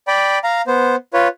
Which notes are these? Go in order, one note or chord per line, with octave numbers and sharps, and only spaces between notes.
D5 G5 B5
F5 A#5
B3 C5
F4 B4 C#5